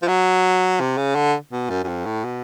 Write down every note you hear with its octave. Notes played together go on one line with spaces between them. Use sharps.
F3
F#3
C3
C#3
D3
B2
F#2
F#2
F2
A2
B2